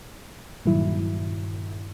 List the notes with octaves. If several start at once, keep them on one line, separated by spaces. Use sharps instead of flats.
G2 A#2 D#3 F#3 E4